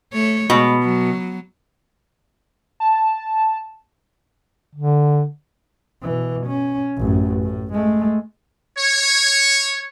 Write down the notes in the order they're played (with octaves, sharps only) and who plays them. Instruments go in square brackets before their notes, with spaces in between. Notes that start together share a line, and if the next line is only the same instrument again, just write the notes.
[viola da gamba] A3 C#5
[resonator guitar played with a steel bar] B2 [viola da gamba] G#3
[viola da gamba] F#3
[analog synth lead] A5
[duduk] D3
[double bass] B2 E3
C#4
A1 F#2
A2
G#3 A3
[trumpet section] C#5